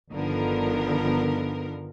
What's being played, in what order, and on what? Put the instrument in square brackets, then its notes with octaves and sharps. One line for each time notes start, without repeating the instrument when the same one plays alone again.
[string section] G1 D3 D#3 F3 B3 A#4